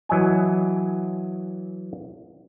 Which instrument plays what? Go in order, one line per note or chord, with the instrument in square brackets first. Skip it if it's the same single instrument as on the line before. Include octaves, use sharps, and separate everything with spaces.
[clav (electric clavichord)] E3 F#3 D#5 G#5